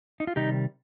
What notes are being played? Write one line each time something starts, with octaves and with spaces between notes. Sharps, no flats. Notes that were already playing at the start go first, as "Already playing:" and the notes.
D#4
F4
C3 D#3 G3 D#4 G4